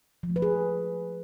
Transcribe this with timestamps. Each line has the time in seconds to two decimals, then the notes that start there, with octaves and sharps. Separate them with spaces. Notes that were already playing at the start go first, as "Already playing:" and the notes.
0.23 F3
0.30 A3
0.36 B4
0.42 G#4